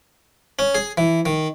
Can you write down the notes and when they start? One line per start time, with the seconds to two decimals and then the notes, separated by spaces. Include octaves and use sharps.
0.59 C#4
0.75 G#4
0.98 E3
1.26 D#3